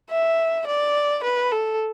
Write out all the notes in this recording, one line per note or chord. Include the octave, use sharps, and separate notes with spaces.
E5
D5
B4
A4